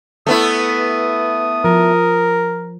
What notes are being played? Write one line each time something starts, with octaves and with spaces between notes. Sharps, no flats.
A3 B3 E4 D#6
F3 A#4